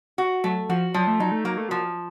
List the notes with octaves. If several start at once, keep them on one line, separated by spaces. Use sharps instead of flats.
F#4
F#3 A3
F3 F#4
F3 F#3
A3
F#3 D#4
A3
F#3 A#3
A3
F3 F#3